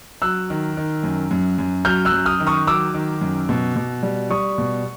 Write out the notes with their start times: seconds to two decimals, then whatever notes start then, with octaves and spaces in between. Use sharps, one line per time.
0.22 F#3 E6 F#6
0.50 D#3
0.77 D#3
1.03 F#2
1.31 F#2
1.58 F#2
1.85 F#3 F6 G6
2.05 E6 F#6
2.12 F#2
2.26 D#6 F6
2.40 D#3
2.47 C#6 D#6
2.67 F#3 D6 E6
2.94 D#3
3.21 F#2
3.49 B2
3.76 B2
4.03 G3
4.30 G3 C#6 D#6
4.58 B2